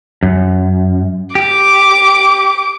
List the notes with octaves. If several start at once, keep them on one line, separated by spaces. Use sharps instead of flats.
F#2
G4 D6